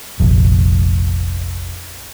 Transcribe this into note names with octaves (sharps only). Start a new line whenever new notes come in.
F1 A#1